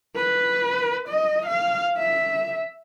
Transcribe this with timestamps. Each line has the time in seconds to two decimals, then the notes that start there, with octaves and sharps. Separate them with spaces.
0.15 B4
1.09 D#5
1.46 F5
1.99 E5